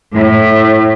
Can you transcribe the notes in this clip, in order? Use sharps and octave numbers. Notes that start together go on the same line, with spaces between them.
A2